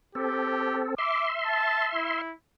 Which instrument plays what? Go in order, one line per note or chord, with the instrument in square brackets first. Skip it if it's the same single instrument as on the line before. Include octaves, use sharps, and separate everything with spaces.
[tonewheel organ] C4 A4 [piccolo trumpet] G4
[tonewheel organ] E5 C6 [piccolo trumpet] D6
[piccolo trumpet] A5
E4